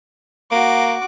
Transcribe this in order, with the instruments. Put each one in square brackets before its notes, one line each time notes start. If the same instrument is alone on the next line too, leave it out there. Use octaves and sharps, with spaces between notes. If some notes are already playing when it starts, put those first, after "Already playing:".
[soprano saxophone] A#3 [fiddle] F#4 D6